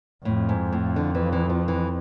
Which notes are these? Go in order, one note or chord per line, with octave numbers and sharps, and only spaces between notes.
F2 A2
G#2
A2
D3
E3
E3
F3
E3